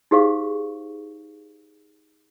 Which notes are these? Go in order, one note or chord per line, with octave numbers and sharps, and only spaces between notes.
D#4 G4 G#4 C5 F5 C#6